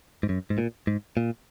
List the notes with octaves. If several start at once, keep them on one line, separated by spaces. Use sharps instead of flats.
G#2
F#2
G#2
A#2
G#2
A#2